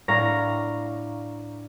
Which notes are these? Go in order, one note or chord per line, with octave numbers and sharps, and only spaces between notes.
A2 D4 F5 A#5 C#6 A#6